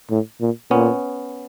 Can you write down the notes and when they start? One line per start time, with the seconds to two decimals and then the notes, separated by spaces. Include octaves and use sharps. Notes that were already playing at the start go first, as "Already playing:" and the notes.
0.10 A2
0.41 A#2
0.71 A#2 B3 C#4